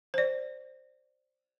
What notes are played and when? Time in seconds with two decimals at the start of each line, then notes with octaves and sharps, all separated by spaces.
0.14 C5 D5